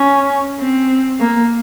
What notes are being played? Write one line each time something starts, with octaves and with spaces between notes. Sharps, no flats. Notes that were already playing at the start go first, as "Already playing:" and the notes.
Already playing: C#4
C4
A#3